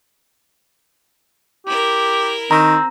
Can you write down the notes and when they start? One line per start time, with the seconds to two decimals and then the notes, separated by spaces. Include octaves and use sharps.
1.66 E4 G4 A#4
2.51 D#3 C4 A#5